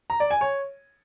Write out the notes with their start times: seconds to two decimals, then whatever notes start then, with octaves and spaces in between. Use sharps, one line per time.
0.10 A#5
0.20 D5
0.31 G#5
0.41 C#5